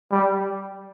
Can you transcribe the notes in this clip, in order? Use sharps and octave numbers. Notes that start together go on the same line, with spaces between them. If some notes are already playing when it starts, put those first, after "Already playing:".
G3